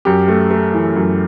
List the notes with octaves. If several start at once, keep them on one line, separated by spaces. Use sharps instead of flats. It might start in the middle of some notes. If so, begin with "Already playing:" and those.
F#2 G4
A3
A3
E3
F#2